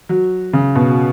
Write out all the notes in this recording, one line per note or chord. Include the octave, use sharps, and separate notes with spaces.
F#3
C#3
B2